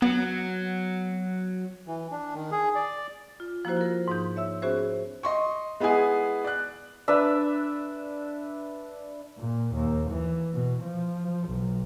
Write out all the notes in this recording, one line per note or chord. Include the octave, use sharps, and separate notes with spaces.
F#3 B3
E3
D4
D#3
G#4
D5
F4
F3 A#3 E4 F#4 C5
F4 A#4
G#2 F3 D#4 G6
C#5 E5 E6
B3 C#4 F#4 G#4 C5 E5
D#5 C6 C#6
G#3 B3 E4 G#4 G#5
D5 F#6
D4 B4 D5 E5
A#2
D#2
E3
B2
F3
B1